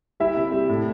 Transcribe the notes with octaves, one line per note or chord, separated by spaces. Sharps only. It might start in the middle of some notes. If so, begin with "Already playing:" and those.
G3 E4 E5
C3
G3
A2